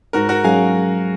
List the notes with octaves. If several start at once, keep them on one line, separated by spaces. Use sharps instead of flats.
G#2 F#4 A#4
F#4 A#4
F#3 C#4 G#4 F5 G#5